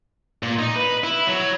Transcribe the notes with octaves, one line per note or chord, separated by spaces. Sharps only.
A#2
D#4
B4
E4
F#3